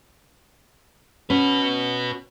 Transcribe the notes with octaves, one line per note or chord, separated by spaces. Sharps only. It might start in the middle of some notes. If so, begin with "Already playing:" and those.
C#4 F#4 B4